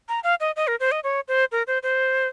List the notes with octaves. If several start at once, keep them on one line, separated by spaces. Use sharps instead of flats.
A#5
F5
D#5
D#5
A#4
C5
D#5
C#5
C5
A#4
C5
C5